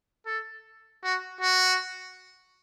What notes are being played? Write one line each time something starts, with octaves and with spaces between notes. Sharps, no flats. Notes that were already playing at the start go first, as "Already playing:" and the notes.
A4
F#4
F#4